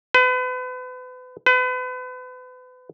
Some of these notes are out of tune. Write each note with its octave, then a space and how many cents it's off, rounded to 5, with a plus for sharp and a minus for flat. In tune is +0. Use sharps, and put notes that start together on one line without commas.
B4 +35
B4 +35